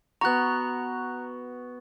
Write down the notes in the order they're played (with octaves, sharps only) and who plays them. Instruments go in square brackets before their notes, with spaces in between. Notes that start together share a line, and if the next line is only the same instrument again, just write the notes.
[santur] B3 F#4 C#6 [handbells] A#5 F#6